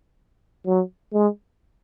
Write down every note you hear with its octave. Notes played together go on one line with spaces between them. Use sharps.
F#3
G#3